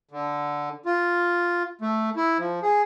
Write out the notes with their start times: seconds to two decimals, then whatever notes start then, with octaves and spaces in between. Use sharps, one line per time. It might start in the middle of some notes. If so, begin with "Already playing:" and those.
0.11 D3
0.85 F4
1.81 A3
2.16 E4
2.38 F3
2.63 G#4